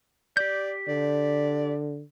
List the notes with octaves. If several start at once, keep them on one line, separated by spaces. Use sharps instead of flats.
G4 D5 G6
D3 D5